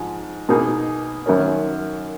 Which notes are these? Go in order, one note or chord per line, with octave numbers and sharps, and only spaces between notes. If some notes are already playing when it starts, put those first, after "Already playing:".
Already playing: G#2 F3
B2 A#3 D#4 G#4
F#2 D#3 A#3 C#4